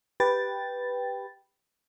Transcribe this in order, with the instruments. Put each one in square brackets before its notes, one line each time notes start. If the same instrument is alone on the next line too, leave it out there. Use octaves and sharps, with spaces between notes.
[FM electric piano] G4 B4 G5 A6